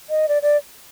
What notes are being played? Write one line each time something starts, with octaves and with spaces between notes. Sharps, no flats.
D#5
D5
D5